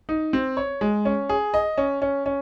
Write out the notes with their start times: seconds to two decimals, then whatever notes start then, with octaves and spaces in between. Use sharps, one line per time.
0.09 D#4
0.33 C4
0.57 C#5
0.81 G#3
1.05 C#4
1.29 G#4
1.54 D#5
1.78 C#4
2.02 C#4
2.26 C#4